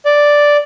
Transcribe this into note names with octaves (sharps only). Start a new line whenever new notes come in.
D5